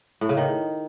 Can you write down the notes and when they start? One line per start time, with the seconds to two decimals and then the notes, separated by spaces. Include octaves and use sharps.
0.21 A2
0.29 C#3
0.37 D#3